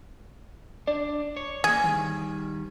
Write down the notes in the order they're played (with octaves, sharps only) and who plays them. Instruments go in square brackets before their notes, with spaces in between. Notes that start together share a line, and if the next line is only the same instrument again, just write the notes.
[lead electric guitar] D4 [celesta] D5
[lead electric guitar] C#5
[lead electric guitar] E3 A#3 [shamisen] G#4
[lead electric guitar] D#3 G3